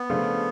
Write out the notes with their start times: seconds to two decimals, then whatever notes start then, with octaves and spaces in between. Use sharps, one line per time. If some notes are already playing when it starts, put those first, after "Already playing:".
Already playing: B3
0.10 C#3 F3 A3 D4 F4